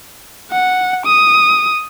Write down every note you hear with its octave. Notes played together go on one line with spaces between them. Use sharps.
F#5
D#6